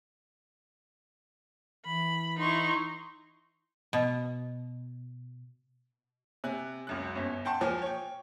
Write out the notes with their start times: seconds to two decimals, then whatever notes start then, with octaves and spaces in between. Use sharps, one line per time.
1.85 E3 B5
2.39 D#4 E4 C6 C#6
3.93 B2
6.44 C3 G#5 F#6
6.87 C#2 F#2 F#6
7.16 G1 C#4
7.45 F#5 G5 A5 C6
7.61 D#2 A#2 F3 G#5
7.82 C#5 G5